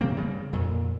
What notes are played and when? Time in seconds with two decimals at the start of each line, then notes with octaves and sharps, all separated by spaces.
0.01 C3 F3 A#3 C4
0.16 G2 C#3 G3
0.53 F2 A#2